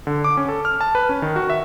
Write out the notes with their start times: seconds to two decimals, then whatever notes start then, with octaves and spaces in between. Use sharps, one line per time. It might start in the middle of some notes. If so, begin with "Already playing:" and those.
0.07 D3
0.24 D6
0.37 C#4
0.48 A4
0.65 F6
0.81 A5
0.95 B4
1.09 C#4
1.22 D#3
1.36 F#4
1.50 E5